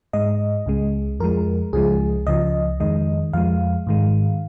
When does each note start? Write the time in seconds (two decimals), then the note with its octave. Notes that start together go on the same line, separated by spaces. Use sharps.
0.13 G#2 G#3 D#5
0.66 C#2 C#3 G#3
1.20 F2 F3 G#3 A#4
1.73 C#2 C#3 F3 G#3 G#4
2.27 C#2 C#3 F3 D#5
2.80 F2 D#3 G#3 D#5
3.33 F2 F3 G#3 F5
3.87 G#2 D#3 G#3